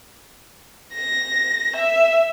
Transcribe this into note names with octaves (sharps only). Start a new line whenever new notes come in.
A#6
E5